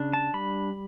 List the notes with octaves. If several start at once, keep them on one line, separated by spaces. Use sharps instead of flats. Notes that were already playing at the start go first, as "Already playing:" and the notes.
Already playing: C#3 D4
A5
G3 B5